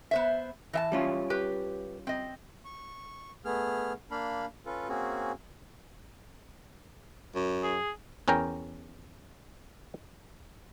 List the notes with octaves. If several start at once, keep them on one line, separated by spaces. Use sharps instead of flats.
B3 C5 E5
E3 E5 A5
G3 C#4 F4
G4 B4
C4 D#5
C#6
A3 B3 G#4 F6
A#3 D4 F5 B5
C#4 F4 A4 B4
A#3 C4 C#4 F#4 G#4
F#2
G#4
E2 C#4 A#4 G5 A#5